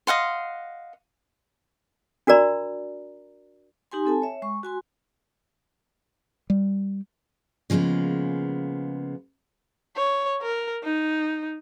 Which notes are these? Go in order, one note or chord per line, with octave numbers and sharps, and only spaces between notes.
D#5 F5 F#5 C6
D4 F#4 A#4 D5 A#5 B5
D#4 G4 G#5 C6
C4 A4 G#5 A5
C#5 E5
G#3 C#6
F#4 G#5 C6
G3
C#3 F3 G#3 A#3 B3
C#5
A#4
D#4